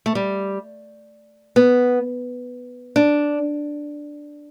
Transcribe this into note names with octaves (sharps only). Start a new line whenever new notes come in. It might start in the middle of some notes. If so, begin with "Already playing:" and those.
A3
G3
B3
D4